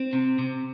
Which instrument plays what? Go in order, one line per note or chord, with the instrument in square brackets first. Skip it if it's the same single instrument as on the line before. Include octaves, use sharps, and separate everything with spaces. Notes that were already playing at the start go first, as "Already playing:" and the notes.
Already playing: [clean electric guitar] C4
C3
C3